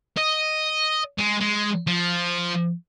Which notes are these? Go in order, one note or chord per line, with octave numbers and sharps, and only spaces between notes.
D#5
G#3
G#3
F3